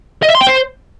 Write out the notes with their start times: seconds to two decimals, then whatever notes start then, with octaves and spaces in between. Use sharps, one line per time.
0.23 D#5
0.29 E5
0.35 C6
0.41 G5
0.47 C5